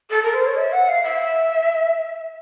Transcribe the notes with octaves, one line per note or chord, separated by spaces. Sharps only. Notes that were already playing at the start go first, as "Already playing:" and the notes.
A4
A#4
C5
C#5
E5
F#5
F5
E5